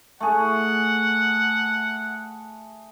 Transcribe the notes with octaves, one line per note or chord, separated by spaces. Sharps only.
A3 G#4 F#5